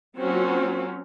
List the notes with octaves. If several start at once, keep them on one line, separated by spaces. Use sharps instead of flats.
F#3 A#3 C4 C#4 F4 F#4